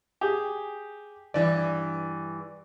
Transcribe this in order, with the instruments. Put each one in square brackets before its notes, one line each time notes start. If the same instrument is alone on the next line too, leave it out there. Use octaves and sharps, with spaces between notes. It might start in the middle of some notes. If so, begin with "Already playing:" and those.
[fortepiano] G4 G#4
[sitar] G2 E3 [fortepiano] D5